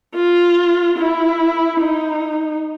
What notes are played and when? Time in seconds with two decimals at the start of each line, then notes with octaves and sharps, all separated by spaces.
0.16 F4
0.98 E4
1.81 D#4